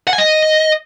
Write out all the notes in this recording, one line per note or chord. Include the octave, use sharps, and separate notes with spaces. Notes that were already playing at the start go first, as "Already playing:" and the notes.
F#5
G#5
D#5